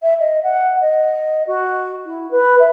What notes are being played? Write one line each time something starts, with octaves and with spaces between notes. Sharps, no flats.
E5
D#5
F#5
D#5
F#4
E4
B4
E5